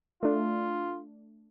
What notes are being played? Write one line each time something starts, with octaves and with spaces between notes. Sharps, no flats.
A3 D4 F4